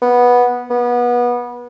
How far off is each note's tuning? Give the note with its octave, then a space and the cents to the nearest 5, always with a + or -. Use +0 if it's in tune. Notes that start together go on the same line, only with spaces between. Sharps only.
B3 -10
B3 -25